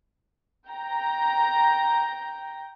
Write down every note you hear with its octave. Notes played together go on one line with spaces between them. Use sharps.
G5 A#5